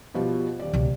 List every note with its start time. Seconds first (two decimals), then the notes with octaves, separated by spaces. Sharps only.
0.14 B2 F3 G3
0.59 D#1 D5
0.73 C#2 B2